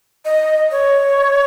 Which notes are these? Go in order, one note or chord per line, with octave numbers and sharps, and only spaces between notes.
D#5
C#5